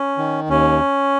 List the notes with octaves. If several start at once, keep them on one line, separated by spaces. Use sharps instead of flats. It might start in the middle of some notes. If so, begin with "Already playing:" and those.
Already playing: C#4
D#3
D#2 C#4